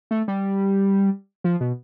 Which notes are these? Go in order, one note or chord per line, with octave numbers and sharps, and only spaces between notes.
A3
G3
F3
B2